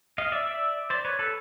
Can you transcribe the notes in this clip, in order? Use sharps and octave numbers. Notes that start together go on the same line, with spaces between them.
D#5 F5
D5 E5
D5 E5
C5 D5
B4 C#5
A4 B4